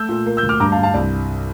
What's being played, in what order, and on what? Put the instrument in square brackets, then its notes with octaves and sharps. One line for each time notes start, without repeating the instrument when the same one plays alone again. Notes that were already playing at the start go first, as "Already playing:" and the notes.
Already playing: [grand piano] A3 E6 G6
A#2
A#3
E6 G6
D2
D6 F6
G2 A#5 D6
F5 A5
G2
F5 A5
C2 D5